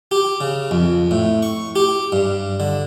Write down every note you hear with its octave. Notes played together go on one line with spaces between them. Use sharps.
G4
C#3
F2
A2
C#6
G4
G2
D3